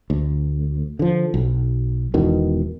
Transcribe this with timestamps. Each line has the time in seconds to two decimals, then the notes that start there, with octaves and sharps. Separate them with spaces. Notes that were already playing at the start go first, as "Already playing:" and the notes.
0.10 D2
0.99 D3 F3
1.34 B1
2.14 E1 E2 B2 D#3